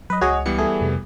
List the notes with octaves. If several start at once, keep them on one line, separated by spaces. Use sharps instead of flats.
F#3 B4 D#5
C#2 F#4 G#4 C#5 D#5
E3 G3 B3 C#7
A3 G#4
F2 C3